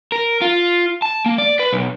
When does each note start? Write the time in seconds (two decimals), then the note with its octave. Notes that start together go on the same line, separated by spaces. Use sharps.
0.12 A#4
0.41 F4
1.02 A5
1.26 A#3
1.38 D5
1.59 B4
1.73 B1